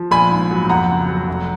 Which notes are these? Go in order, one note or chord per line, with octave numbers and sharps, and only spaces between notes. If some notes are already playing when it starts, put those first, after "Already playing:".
Already playing: F3
A#1 G#5 B5
G#2
F#3
F2 F#5 A#5
C#3
F#3
F1